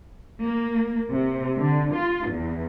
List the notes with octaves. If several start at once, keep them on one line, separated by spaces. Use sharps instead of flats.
A#3
C3
D3
F4
E2